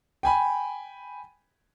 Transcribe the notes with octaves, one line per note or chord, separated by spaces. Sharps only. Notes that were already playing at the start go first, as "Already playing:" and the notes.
G5 G#5 B5